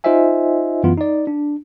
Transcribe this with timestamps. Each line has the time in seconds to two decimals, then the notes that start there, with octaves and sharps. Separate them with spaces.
0.04 D#4 F4 C5 D#5 E5 G#5
0.83 F#2 E3 B3 F4
0.97 D#4 D5
1.27 D4